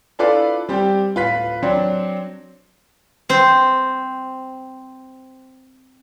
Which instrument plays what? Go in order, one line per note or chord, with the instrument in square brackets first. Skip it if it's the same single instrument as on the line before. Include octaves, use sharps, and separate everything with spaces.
[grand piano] D4 E4 F4 A4 B4 D5
G3 C4 G4
D1 F4 B4 B6
F#3 C4 D4
[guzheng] C4 C5